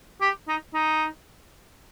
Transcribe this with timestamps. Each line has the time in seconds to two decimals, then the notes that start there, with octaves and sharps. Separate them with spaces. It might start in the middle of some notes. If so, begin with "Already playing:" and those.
0.21 G4
0.48 D#4
0.74 D#4